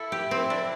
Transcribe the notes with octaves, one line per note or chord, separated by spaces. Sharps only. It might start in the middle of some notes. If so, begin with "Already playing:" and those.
Already playing: E4 A4
G4
C4
D4